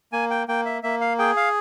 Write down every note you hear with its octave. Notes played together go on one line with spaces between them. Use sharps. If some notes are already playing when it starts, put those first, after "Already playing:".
A#3 G#5
G5
A#3 G5
E5
A#3 E5
F5
G#4 G5
F5